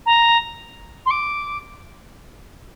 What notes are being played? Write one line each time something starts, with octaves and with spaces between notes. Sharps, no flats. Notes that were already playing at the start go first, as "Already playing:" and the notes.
A#5
C6
D6